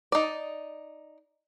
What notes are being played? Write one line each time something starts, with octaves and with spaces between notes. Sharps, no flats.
D#4 D5